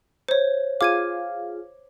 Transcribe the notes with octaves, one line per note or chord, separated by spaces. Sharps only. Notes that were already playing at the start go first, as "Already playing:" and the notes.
C5 C#5
F4 G#4 F5 D6 G#6 D#7